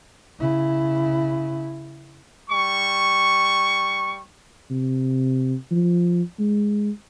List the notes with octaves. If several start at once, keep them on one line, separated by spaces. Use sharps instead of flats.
C#3 E4
G3 C#6
C3
F3
G#3